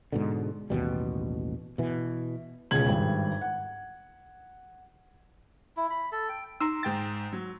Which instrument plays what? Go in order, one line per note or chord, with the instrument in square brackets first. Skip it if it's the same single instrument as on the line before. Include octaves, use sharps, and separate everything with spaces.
[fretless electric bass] G#2 B2 D3
A1 D#2 B2 G3
B2 E3
[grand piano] E1 C#2 C#3 G#6 F#7
G#1 G2
F#5
[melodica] E4
B5
A4
G5
[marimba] D#4 [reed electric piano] A#5 C6 E6
[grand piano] G#2 G5 A6
F#3